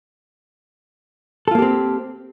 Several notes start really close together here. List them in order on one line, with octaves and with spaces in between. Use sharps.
A4 F4 A#3 G4 C4